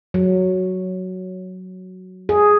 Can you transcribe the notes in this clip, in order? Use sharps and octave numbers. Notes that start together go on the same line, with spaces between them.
F#3
G#4